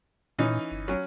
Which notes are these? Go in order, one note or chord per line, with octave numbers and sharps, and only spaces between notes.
A#2 E3 C#4 D#4
G1
F#3 C#4